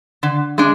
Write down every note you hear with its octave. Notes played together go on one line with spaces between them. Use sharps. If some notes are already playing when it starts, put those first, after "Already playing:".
D3
G#3 D4